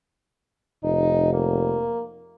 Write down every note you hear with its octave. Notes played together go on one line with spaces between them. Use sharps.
F1 D#4
A#3